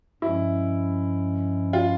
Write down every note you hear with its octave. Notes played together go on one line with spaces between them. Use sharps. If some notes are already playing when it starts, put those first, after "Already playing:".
G2 F3 G#3 C#4 E4
F4